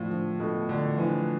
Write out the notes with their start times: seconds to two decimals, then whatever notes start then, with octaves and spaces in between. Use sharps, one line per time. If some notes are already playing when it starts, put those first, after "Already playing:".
Already playing: A2 F3 D4
0.10 F3
0.40 B2 A3
0.69 D3 D4
0.98 E3 F3